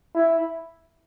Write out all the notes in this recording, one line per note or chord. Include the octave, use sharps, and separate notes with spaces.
E4